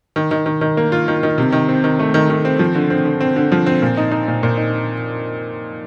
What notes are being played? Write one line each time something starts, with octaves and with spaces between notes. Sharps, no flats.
D#3
D#3
D#3
D#3
A#3
F4
D#3
D#3
C3
D#3
C4
D#3
A3
D#3
D#3
C4
F3
D3
C4
D3
C4
D3
F3
C4
A#2
D#4
D#4
A#2
A#2
D#4